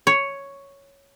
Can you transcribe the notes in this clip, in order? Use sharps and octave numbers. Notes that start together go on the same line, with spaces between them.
C#5